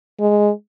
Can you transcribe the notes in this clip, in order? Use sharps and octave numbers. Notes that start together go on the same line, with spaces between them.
G#3